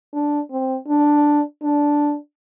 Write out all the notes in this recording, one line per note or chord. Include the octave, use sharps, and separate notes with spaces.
D4
C4
D4
D4